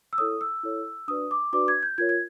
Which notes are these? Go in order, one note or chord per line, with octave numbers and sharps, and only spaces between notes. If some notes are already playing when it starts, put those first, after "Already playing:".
E6
E4 A4 C#5 D#6
E6
E4 A4 C#5
D4 F#4 B4 D5 D#6
D6
D4 F#4 B4 D5 D6
G#6
G6
F4 A#4 C#5 G#6
G#6